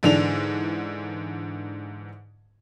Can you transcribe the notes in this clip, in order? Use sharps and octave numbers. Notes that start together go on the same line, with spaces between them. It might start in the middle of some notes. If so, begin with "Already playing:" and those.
G#2 D3 E3 D4 F7